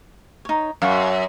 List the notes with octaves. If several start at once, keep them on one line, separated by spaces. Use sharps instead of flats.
D#4 C#5
F#2 F5 F#5 C#6